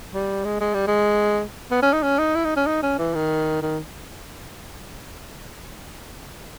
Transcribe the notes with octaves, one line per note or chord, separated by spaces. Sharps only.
G3
G#3
G#3
G3
G#3
B3
C#4
D#4
C#4
D#4
E4
D#4
C#4
D#4
C#4
E3
D#3
D#3